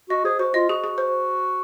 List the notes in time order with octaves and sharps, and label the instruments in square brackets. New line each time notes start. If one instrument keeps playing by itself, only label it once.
[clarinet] F#4 [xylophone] D#5
[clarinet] G#4 [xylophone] C5
[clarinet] F#4 [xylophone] C5
[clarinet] F4 [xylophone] D#5
[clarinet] F#4 [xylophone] G#4
[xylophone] G#4
C5